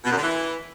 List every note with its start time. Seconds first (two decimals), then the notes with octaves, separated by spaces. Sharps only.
0.05 B2
0.11 F#2
0.17 D3
0.23 E3